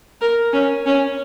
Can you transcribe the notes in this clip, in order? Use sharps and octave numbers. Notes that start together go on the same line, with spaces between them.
A#4
C#4
C#4